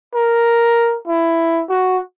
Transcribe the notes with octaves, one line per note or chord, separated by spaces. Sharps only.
A#4
E4
F#4